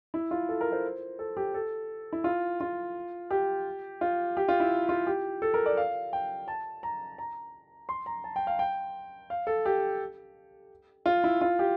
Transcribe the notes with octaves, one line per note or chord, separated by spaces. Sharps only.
E4
F4
A4
A#4
C5
A4
G4
A4
E4
F4
F4
G4
F4
G4
F4
E4
F4
G4
A4
A#4
D5
F5
G5
A5
A#5
A#5
C6
A#5
A5
G5
F5
G5
F5
A4
G4
F4
E4
F4
G4